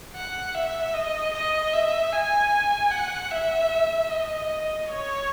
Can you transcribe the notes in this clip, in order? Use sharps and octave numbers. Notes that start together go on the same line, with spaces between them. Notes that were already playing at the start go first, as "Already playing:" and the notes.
F#5
E5
D#5
D#5
E5
G#5
F#5
E5
D#5
C#5